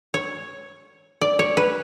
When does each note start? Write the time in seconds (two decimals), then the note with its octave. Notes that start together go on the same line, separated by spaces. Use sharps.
0.14 C#5
1.21 D5
1.39 C#5
1.57 B4